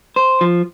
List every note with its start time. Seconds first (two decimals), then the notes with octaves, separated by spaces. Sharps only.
0.16 C5
0.41 F3